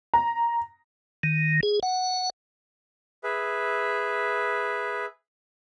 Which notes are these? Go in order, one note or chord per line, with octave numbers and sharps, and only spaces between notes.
A#5
D#3
G#4
F#5
G#4 B4 E5